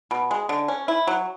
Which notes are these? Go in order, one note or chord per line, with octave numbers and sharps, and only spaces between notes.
B2
G#3
D3
C#4
E4
F#3